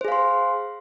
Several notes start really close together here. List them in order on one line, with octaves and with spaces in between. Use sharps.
C5 G#4 F5 C6